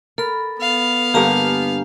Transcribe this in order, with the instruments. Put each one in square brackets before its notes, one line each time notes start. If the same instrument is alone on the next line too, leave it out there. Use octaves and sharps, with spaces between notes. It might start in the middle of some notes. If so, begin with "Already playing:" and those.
[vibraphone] A4 B5 [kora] A#4
[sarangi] B3 [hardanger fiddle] F5
[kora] G2 D3 A#3 [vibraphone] G4 G#5 A#5